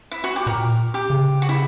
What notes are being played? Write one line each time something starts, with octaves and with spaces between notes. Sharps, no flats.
E4
F#4
G4
A#2 A#4
G4
C#3
F#4
E4